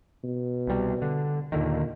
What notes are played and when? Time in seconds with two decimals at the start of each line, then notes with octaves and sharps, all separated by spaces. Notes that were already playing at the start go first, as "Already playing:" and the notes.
0.24 B2
0.67 C2 G3
1.02 D3
1.52 D#2 A#2 D3 D#3